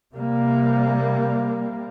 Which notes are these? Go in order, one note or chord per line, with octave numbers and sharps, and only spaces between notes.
C3 G3 A#3